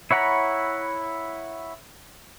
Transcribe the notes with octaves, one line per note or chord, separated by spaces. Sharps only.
E4 C#5 F#5 A#5 B5